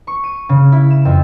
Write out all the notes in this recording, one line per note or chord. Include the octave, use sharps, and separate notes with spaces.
C#6
D#7
C#3
E4
E7
F2